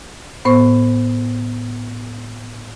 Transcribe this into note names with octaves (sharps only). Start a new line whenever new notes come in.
A2 B3 C5 C#6